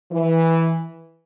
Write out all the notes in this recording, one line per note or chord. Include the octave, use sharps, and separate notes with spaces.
E3